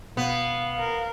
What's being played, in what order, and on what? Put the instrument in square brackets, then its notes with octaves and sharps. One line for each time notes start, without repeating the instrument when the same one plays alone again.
[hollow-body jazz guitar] B2 [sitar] B3 [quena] F5
[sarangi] A#4